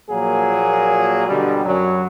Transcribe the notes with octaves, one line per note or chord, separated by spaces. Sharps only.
A#2 F3 F#3 A#3 G#4
B2 D3 G3
F#2 F#3